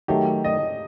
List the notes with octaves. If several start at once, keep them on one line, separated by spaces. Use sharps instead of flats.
D#3 F#3 A3 G4
D#5